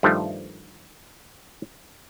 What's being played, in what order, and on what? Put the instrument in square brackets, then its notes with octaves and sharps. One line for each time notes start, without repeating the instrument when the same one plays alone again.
[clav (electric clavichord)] G2 D#3 F3 G3 A3